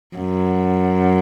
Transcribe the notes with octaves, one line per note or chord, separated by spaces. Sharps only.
F#2